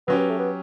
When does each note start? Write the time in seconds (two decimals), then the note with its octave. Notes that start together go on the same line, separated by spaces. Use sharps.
0.07 F#3 B3 C#4 G4
0.18 B3
0.29 A3
0.39 B3